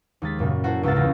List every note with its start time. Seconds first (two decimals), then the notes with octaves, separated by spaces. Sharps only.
0.22 D#2 G#3 A6 B6
0.39 F#2 A#2 C#3 F#4
0.63 E4 F#4 A4 C5
0.83 C#2 G#2 F#4 F5 E6 A6
0.96 E2 C#3 F4 G4 A6 A#6